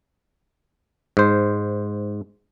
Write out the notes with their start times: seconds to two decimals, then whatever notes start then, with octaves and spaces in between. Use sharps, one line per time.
1.17 G#2 C5